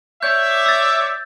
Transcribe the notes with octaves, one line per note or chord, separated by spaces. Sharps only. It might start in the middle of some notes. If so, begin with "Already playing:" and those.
C#5 D5 E5 G6
E6 A6